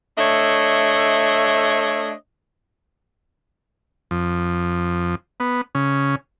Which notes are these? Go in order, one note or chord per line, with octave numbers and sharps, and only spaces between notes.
A3 D4 C#5 D#5 E5
F2
B3
C#3